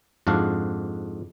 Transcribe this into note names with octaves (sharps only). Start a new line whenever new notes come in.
F2 G#2 D4 F#4 F5